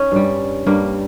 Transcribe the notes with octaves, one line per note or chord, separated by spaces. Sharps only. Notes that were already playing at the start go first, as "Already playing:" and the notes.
Already playing: C#4 D#4
G2 G3
G2 G3 A#3